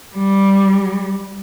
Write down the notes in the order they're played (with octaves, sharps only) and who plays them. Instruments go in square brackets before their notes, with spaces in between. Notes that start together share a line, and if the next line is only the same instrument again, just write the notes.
[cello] G3